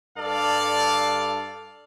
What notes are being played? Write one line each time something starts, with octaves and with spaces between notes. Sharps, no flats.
G2 A4 D5 F5